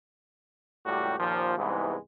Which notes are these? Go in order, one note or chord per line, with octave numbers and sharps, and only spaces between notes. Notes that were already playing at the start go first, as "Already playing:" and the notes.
C#2 A2 G3 F#4 G4
D#2 A#2 F3
C2 G#2 E3 G#3 B3